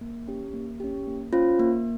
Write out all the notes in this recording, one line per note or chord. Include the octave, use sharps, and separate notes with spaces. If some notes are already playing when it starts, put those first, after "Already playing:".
A#3
C#4 G4
A#3
C#4 G4
A#3
C#4 F4 C5 F5
A#3